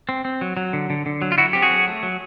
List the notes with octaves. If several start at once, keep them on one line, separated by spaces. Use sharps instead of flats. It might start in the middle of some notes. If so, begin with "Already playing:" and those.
C4
C4
F#3
F#3
D3
D3
D3
F#3
F4
F#3 E4 F#4
C4 G4
F#4 G#4
F#3
A3
F#3